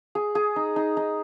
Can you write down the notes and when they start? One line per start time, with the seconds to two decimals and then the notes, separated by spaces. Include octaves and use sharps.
0.15 G#4
0.35 G#4
0.56 D#4
0.76 D#4
0.97 D#4